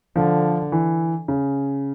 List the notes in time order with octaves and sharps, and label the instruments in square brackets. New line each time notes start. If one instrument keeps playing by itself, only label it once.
[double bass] D3 [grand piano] F3
[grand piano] E3
C#3